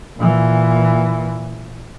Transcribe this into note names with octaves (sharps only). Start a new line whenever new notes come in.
A#2 E3